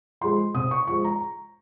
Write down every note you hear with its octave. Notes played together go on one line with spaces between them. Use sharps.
F3 G#3 C6
C3 D#6
C#6
F3 G#3 C#6
A#5